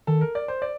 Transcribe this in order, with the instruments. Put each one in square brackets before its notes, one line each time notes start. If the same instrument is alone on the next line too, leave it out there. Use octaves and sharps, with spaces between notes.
[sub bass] D#3 [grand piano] A4
[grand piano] A#4
D5
C5
D5